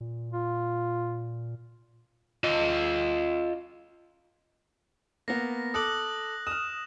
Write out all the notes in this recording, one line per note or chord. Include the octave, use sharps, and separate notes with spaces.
A#2
F4
F4 D#5
A#3 B3 A#6
A4 D6 D#6 F#6 F#7
D#6 F6 E7